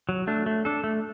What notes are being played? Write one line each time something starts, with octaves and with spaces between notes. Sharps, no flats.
F#3
A3 D4
A3
D4 A4
A3